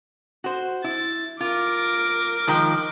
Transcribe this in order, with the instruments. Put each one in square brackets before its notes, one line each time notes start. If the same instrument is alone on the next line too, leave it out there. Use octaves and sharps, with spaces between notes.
[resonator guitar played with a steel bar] F#4 C5
[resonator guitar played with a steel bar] E4 [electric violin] A6
[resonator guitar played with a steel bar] F4 [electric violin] A#4 D6
[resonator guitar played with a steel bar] D#3 F3 G#3